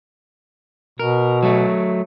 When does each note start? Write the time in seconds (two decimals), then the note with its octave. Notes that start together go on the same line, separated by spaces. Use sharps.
0.99 B2 A#4
1.43 F#3 A3